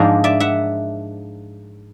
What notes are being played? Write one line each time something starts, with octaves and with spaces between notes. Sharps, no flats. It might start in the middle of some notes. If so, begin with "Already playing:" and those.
Already playing: G#2 F3 A#3 D4 G#4 A#4
D5 E5
E5 F#5